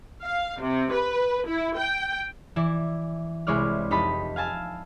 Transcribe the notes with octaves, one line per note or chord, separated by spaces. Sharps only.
F5
C3
B4
E4
G5
E3 E4 D5
C2 G#3 E4 C#5 D5 F6
F1 D#4 G4 A5 B5 D#6
F5 G#5 A5 E6